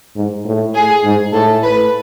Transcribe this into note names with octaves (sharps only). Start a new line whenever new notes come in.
G#2
A2
G#4
G#2
A2 A4
B4